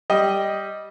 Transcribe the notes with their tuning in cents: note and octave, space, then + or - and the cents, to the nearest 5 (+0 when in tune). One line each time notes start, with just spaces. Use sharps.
G3 +0 D#5 +10